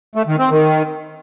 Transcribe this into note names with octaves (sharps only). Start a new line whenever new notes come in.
A3
D#3
C4
D#3